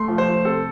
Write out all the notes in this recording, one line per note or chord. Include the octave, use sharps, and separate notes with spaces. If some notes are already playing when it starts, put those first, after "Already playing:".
Already playing: A3 C6
F3
C5
F3
C3 A4